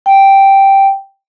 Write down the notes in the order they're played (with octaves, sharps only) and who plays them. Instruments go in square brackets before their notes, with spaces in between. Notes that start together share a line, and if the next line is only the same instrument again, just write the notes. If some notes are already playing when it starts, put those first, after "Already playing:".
[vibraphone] G5